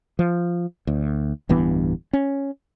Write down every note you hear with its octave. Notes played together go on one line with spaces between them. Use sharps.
F3
D2
D1 G2 E3 B3
C#4